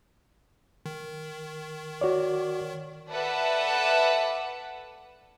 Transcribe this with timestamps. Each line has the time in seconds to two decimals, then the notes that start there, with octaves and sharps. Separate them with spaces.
0.86 D#3
2.01 F#4 C#5 D5
3.12 A4 B4 D5 E5 F#5 A5